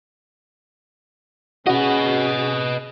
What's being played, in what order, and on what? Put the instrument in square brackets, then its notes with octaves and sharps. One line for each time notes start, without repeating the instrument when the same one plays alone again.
[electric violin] C#4 G#4 [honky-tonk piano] F#4 [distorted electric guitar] B4 D#5